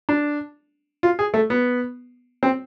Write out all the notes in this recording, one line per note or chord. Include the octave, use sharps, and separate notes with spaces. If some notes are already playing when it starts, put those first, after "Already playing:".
D4
F4
G#4
A3
B3
C4